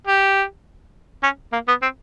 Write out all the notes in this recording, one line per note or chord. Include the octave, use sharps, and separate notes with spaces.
G4
C#4
A#3
B3
C4